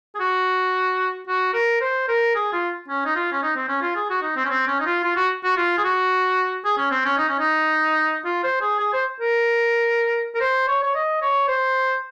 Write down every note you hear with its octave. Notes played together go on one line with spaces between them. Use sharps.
G#4
F#4
F#4
A#4
C5
A#4
G#4
F4
C#4
D#4
F4
C#4
D#4
C4
C#4
F4
G#4
F#4
D#4
C4
C#4
C4
C#4
D#4
F4
F4
F#4
F#4
F4
G#4
F#4
G#4
C#4
C4
C#4
D#4
C#4
D#4
F4
C5
G#4
G#4
C5
A#4
A#4
C5
C#5
C#5
D#5
C#5
C5